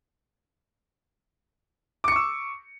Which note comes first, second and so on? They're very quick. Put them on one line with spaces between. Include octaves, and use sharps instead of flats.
D6 C#7 C#6 E6